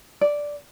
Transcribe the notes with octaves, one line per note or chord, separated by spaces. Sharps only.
D5